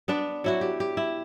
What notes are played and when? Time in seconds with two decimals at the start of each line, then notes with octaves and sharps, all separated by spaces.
0.08 B3 D4 B4 D5
0.44 F#3 E4 F#4
0.61 G4
0.80 G4
0.97 E4